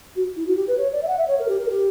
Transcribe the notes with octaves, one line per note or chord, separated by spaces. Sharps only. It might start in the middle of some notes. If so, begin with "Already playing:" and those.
F#4
E4
F#4
G4
B4
C#5
D5
E5
F#5
E5
C#5
A#4
G4
A#4
G4